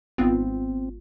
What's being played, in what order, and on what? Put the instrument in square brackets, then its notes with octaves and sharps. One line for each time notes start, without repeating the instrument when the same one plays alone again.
[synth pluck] G#1 B3 F4 [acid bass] C4